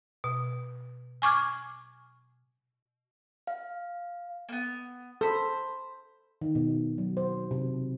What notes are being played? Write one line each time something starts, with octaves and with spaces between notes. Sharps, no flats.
B2
G#5 C#6 D6 F6 G#6
F5
A#3 B3
A4 C5 B5
D#3
B2
F#3
C5
C3